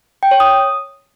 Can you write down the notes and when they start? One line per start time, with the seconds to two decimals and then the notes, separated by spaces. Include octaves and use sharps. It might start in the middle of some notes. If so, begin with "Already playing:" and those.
0.23 G5
0.31 C#5
0.40 D#6